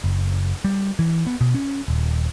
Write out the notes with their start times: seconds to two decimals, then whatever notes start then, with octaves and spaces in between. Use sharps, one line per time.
0.04 F#1
0.64 G3
0.99 E3
1.27 B3
1.41 B2
1.54 C#4
1.88 D#1